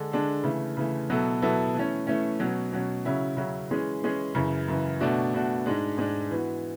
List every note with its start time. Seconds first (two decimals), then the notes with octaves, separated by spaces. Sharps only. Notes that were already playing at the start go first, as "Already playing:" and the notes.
Already playing: D3 G#3 D4 A4
0.12 D3 G#3 D4 A4
0.43 C#3 E3 A3
0.77 C#3 E3 A3
1.10 B2 F#3 B3 E4 A4
1.42 B2 F#3 B3 E4 A4
1.74 E3 A3 C#4
2.07 E3 A3 C#4
2.39 B2 F#3 C#4
2.72 B2 F#3 C#4
3.05 C#3 F#3 C#4 E4
3.37 C#3 F#3 C#4 E4
3.70 E3 G#3 C#4 G#4
4.03 E3 G#3 C#4 G#4
4.35 F#2 C#3 E3
4.68 F#2 C#3 E3
5.00 B2 A3 D4 F#4
5.33 B2 A3 D4 F#4
5.66 G#2 G#3 D4
5.97 G#2 G#3 D4
6.31 E3 B3 F#4